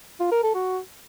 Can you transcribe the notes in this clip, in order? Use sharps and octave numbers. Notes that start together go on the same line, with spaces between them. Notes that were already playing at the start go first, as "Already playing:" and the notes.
F4
A#4
A4
F#4